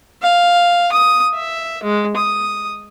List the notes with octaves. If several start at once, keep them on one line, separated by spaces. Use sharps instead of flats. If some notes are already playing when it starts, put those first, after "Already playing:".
F5
D#6
E5
G#3
D#6